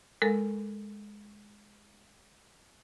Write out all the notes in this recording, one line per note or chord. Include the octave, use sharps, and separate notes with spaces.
G#3 A4 A#4